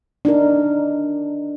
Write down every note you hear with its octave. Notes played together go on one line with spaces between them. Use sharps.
D4 D#4 A#4